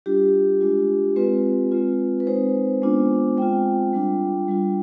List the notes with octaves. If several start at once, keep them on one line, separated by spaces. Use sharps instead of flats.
G3 D4 F4 G4
G#3 D4 F4
G#3 C4 F4 B4
G#3 C4 F4
B4
G#3 C4 D#4 C5
G#3 B3 D4 F4
G#3 C4 F4 G5
G3 D4 F4
G3 D4 F4